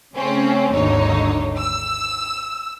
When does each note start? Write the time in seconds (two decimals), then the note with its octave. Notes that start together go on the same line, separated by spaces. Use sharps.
0.15 C#3 A3 C4 C#4
0.71 G#1 D#2 D3 D#4 C#5
1.58 E6